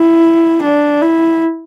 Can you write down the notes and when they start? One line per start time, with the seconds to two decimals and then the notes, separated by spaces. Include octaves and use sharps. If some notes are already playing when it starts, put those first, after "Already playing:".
Already playing: E4
0.63 D4
1.01 E4